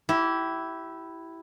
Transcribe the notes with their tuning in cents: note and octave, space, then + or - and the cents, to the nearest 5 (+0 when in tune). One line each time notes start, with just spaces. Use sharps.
E4 +0 G4 -25